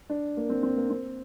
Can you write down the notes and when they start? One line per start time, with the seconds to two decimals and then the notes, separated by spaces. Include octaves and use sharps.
0.10 D4
0.37 A#3
0.49 C4
0.63 C4
0.77 A#3
0.90 C4